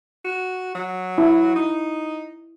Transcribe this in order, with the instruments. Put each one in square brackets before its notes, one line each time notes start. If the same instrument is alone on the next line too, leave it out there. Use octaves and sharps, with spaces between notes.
[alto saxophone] F#4
F#3
[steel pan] E4
[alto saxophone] D#4